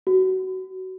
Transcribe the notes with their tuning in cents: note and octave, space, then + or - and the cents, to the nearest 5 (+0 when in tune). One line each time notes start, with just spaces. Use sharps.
F#4 +20